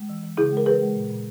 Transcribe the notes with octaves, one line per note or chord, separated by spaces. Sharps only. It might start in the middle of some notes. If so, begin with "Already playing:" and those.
Already playing: G#3
E3
E3
C#3 E4 G#4
G#3
A#4
E3 G#4 B4
G#3
A#2
A#2